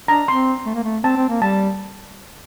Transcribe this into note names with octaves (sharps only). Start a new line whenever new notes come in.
D4 A#5
C4 C6
A3
A#3
A3
C4 A5
C4
A#3
G3 A5